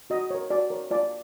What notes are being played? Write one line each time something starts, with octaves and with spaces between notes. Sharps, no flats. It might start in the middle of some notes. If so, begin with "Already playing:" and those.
F#4 D#5
A#4 C#5
F#4 D5
A#4 C#5
F4 D5